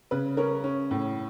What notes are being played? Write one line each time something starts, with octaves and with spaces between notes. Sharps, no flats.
C#3 B4
C#4 A#4
C#4
A2